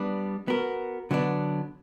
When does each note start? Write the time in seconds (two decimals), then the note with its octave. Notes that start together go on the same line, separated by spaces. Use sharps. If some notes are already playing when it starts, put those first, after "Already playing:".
Already playing: G3 B3 D4
0.48 B3 F#4 A#4
1.11 D3 F#3 B3 D4